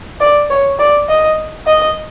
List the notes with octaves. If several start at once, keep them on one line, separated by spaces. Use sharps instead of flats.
D5
C#5
D5
D#5
D#5